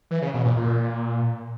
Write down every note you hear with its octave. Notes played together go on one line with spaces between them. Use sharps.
E3
C#3
B2
A#2
A#2